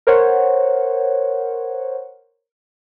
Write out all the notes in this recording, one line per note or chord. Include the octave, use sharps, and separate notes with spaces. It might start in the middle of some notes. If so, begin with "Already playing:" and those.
A#4 C5 C#5 F#5